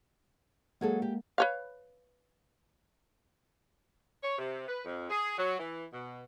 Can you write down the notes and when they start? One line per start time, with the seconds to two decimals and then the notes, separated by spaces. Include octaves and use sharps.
0.81 F#3 G#3 A#3 G#4 A4
1.02 G4
1.38 B4 C#5 F5
4.23 C#5
4.38 C3
4.68 B4
4.85 F2
5.09 G#4
5.38 F#3
5.59 E3
5.93 B2